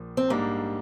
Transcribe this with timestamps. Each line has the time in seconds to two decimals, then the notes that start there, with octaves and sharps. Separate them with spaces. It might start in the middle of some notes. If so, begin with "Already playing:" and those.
Already playing: A#1 A#2 F3
0.17 C4
0.30 G#2 G3 A#3 D4